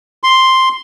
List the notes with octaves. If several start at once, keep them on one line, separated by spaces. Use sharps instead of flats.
C6